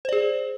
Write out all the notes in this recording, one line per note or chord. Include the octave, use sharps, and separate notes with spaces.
G#4 C5 D5